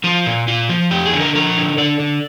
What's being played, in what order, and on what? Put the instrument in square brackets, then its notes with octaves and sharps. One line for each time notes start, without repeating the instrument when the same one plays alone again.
[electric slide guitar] F3 F4
A#2
A#2 F4
F3
F2 G4
G#4
D3
A#4
F3 A#4
D3
D3 D5
D3